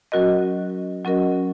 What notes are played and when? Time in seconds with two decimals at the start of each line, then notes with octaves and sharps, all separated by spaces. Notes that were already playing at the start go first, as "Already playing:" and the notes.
0.12 F#3 C#4 F#4 A#4 D#5
1.05 F#3 C#4 F#4 A#4 D#5